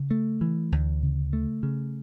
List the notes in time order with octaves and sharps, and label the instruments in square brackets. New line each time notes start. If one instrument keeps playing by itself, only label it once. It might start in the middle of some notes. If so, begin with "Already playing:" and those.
Already playing: [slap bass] C#3
A3
E3
D2
C#3
A3
C#3